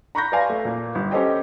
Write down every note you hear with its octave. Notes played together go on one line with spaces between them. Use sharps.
A#5 B5 C#6 F#6 G6 A#6
B4 D5 F5 G#5 A5 C6
A3
A#2 A#3
G1
C#4 G4 A4 C5 D#5 G5